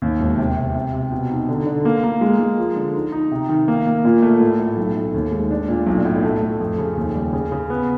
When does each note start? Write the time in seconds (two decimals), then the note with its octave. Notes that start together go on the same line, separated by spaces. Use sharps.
0.02 D#2
0.20 E1
0.38 C3
0.56 C3
0.75 C3
0.93 C3
1.12 B2
1.30 D#4
1.49 D3
1.67 D3
1.85 A#3
2.04 A#3
2.21 G#3
2.40 G#3
2.58 F3
2.76 D3
2.95 D#4
3.12 D#4
3.31 C3
3.49 D#3
3.68 A#3
3.86 A#3
4.05 A#2
4.22 A3
4.40 A2
4.59 A3
4.77 B1
4.96 A3
5.14 D#2
5.32 G#3
5.51 D4
5.68 A#2
5.87 B1
6.05 A2
6.23 A3
6.42 A3
6.60 F2
6.78 C#3
6.97 D#2
7.15 G3
7.33 C#3
7.52 C#3
7.70 B3